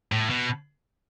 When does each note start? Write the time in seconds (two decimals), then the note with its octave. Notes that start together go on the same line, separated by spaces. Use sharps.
0.12 A2
0.30 B2